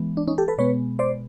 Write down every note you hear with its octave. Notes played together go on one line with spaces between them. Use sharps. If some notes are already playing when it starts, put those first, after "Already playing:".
Already playing: E3 G#3 B3
D4
C#4 D#4
G4 A4
A4 B4
B2 G#3 B3 B4 C#5
C5 D5